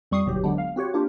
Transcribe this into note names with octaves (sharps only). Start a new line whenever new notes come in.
F2 G3 C#6 D#6 C7
G1 D#2 B2 F#3 G4
D3 F#3 G#3 B3 D4
F5
C4 F#4 G4 C#5
A#3 D4 F4 G4